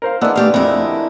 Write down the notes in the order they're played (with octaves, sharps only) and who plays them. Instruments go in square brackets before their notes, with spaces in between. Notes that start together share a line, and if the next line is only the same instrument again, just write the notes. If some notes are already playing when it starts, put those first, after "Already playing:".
[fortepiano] A#4 C5 F5
[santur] G#3 D4 F#5 [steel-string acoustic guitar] B3 E4 [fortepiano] E6
[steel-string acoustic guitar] A3 G4 F5
[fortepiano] F2 [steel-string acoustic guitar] E4 A#4